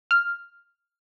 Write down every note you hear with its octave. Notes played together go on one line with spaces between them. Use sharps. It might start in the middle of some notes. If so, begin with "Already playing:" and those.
F6